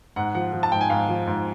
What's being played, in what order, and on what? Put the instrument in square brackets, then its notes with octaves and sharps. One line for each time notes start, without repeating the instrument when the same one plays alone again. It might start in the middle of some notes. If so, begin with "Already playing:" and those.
[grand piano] G#2 F#5
F3 F#5
F3
A5
G#2 G5
G#5
G#2 F5
F3
G#2